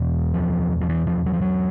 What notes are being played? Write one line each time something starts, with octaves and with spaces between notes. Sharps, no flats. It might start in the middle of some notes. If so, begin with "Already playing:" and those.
Already playing: E2 B2
F3
F3
E3
F3
F#3
F3
F#3